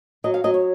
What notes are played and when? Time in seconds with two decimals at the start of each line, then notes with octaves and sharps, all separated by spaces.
0.24 F#3 D#5
0.34 F5
0.44 F#3 D#5
0.54 C#5